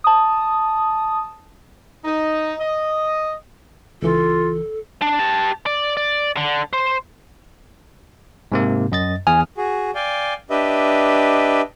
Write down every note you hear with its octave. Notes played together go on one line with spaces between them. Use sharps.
A5 D#6
D#4
D#5
C#2 E3 F4 A4
D4
G4 A5
D5
D5
D3
C5
G#2 C3 A#3
F#2 D#5 A6
E2 G#5 D#6 F6
F#4 G#4
D5 F5 G5 G#5
D4 G4 B4 D#5 E5